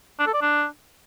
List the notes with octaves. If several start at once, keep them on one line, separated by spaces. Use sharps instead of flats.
D4
A4
D5
D4